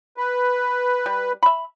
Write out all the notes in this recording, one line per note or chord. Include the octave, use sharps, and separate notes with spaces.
B4
G3
E5 B5